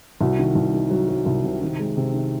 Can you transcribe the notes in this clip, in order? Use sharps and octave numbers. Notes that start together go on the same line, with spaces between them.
C2 F#4
D#3
C2
D#3
F#3
F#3
C2
C3
D#3
G#3
C3
D#3